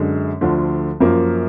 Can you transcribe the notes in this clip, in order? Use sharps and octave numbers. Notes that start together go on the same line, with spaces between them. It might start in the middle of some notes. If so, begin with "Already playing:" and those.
Already playing: F#2 D3 G#3
D2 D3 F3
F#2 F3 A#3